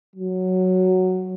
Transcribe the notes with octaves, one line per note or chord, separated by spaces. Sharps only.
F#3